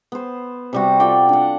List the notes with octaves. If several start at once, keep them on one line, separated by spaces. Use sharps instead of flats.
B3 C5
C3 G3 F#4
F4 A4 D5 G5
D4 F#5